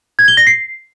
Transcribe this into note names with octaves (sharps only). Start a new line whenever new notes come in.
G#6
G7
A#6
C7